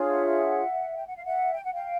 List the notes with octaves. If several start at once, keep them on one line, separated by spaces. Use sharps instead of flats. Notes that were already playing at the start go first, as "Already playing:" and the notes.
Already playing: D4 F4 G#4 C#5
E5 F#5
G5
F#5
F5
E5 F#5
G5
F#5
F5 G5